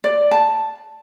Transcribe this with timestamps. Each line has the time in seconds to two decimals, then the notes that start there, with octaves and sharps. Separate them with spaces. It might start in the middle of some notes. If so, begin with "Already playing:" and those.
0.04 D5
0.31 A5